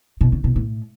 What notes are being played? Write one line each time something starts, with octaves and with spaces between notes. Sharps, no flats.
B2
C#3
B2
A2